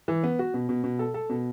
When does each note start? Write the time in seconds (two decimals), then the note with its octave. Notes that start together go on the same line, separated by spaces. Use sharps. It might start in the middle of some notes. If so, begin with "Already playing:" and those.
0.08 E3
0.23 B3
0.39 F#4
0.54 B2
0.69 B2
0.84 B2
0.99 A4
1.14 A4
1.29 B2